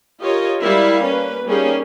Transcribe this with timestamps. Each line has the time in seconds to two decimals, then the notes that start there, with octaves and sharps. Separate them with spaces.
0.21 F4 G4 A#4 C#5 D#5
0.59 G3 G#3 E4 A#4 F5
1.03 A#3 C#4 B4
1.45 G3 A#3 C#4 D#4 G4 G#4